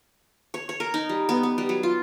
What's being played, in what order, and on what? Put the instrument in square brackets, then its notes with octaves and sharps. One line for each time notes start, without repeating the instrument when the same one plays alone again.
[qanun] C#5
C#5
A#4
D#4
G3
B3
B3
G3
F#3
F4